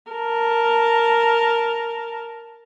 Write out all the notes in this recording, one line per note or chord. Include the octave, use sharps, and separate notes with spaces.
A#4 A5